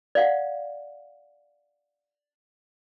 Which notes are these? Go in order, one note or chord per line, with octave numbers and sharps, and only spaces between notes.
D5 F5 F#5